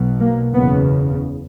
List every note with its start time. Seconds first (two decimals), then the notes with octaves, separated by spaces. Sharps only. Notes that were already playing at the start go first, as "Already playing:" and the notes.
Already playing: B1 B2
0.19 A#3
0.54 F#1 E2 C#3 B3